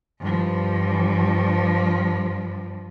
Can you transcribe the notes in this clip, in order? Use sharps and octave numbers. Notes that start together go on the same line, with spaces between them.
G2 F3